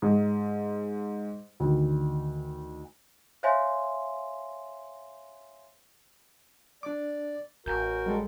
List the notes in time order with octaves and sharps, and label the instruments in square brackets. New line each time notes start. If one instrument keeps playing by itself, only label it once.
[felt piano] G#2
D2 D#3
[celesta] C5 C#5 E5 F5 G#5 C6
[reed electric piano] D4 D6 [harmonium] D5
[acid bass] A1 [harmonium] F#4 A#4 [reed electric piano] G#5 G6
[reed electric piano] G3 G#3 A4